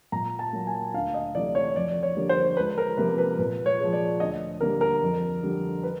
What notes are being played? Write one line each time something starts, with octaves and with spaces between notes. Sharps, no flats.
A#2 A#5
A5
F#3 A#3
G#5
D2 F5
D#5
C3 E3 A3 D5
C#5
F2 D5
C#5
D3 G3 A#3
C5
C#2 B4
A#4
C3 F3 A#3 B4
B4
A#2 B4
C#5
F3 G#3
D5
D2 D#5
D3 G3 A#3 A#4
A#4
F2
D3 G3
B4